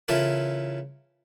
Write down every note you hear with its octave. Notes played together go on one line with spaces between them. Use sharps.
C#3 E3 E4 F4 A4 A#4